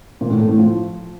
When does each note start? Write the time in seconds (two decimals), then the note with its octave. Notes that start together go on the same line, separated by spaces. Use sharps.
0.21 A#2
0.30 A2
0.39 A3
0.49 A2
0.58 F3